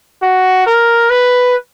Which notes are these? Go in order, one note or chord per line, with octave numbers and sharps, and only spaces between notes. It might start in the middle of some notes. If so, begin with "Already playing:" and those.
F#4
A#4
B4